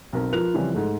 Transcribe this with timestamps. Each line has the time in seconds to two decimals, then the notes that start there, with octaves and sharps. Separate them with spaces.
0.13 B1 C4 A#4
0.33 F3 F4 A#4 B4 F#6 F7
0.54 C#3 E3 F3 G3 C4 C#4
0.74 G#2 G#3 A3